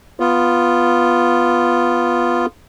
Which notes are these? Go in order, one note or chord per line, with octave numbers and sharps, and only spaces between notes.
B3 F4